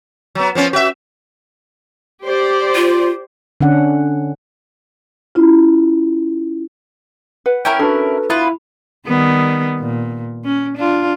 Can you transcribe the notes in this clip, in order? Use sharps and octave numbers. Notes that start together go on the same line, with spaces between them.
F#3 B3
F3 B3 C#4
F#4 E5
G4 C5 D5
F4
D3 C#4 D4 F#5
C#4 E4 F4
B4 F#5
C#4 E4 A#4 G5
D4 F#4 A4 B4
B3 E4 F4 B4
D#3 G3 B3
A#2
C#4
D4 F4